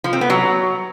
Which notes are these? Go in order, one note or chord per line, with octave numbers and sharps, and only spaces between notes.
F3
C4
B3
F#3